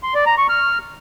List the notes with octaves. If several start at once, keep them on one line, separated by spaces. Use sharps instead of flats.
C6
D5
A#5
C#6
F6